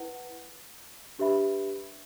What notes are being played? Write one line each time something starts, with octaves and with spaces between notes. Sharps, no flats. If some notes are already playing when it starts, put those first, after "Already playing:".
Already playing: E4 B4 F#5
D4 G4 B4 E5 B5